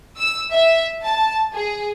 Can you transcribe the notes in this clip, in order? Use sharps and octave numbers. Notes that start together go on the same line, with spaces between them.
E6
E5
A5
G#4